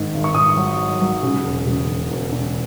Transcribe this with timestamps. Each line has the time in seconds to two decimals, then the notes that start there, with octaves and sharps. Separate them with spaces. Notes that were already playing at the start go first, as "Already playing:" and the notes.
Already playing: G#1 G#2 D#3
0.14 G#1
0.24 C#6
0.34 G#1 D#6
0.57 F#3
0.79 F#3
1.01 F#3
1.23 C#3
1.44 E1
1.66 C#3
1.89 E1
2.11 E1
2.32 E1